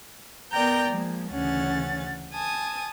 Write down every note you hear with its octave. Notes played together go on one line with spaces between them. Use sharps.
B3 A#4 D5 G5 A#5 G6
F3 G#3 A#3
D2 C#3 E3 C#4 F#5 A6
G#5 A5 D#6